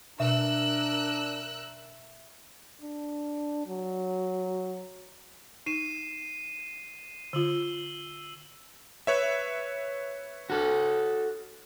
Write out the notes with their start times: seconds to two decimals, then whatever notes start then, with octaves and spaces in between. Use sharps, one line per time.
0.20 B2 D4 A#4 E5 E6 F#6
2.81 D4
3.67 F#3
5.66 D#4 C7 D#7 E7
7.33 D3 F4 E6 F#7 G7
9.07 B4 C#5 E5
10.50 F#4 A4